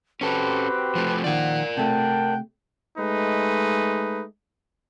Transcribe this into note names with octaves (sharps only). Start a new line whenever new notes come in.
C4 C#4 F#4 G4 A4 B4
F3 A3
A#2 D#3 F3 A#4 D5 F#5
C3 A3 F#5 G5 A5
G#3 A3 D#4 B4